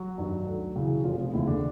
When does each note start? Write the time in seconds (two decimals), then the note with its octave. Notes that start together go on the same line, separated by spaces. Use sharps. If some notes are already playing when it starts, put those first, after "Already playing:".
Already playing: F#3 F#4
0.18 G2 D#3
0.46 D2
0.76 C#3 E3
1.04 F1 F3 F4
1.19 F3 F4
1.33 D#2 C#3 E3 E4
1.47 D3 D4